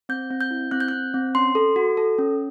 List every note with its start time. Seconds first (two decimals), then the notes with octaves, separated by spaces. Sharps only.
0.09 C4 G6
0.31 C4
0.41 G6
0.51 E4
0.71 C4 F#6
0.80 G6
0.88 C4 F#6
1.14 C4
1.35 C#4 C6
1.55 A4
1.76 F#4
1.97 A4
2.19 C#4